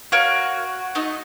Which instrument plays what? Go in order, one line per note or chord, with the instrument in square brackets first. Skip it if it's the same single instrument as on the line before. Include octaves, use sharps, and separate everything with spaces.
[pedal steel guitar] F#4 [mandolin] A#4 C#5 F5
[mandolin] A3 D#4 D#5